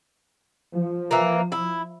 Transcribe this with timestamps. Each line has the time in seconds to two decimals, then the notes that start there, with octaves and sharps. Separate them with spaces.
0.74 F3
1.11 E3 A#3
1.52 E4